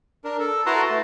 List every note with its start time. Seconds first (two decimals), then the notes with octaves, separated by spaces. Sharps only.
0.24 D4 A#4
0.39 A4
0.66 E4 F#4 B4 A5 A#5 C6
0.90 A3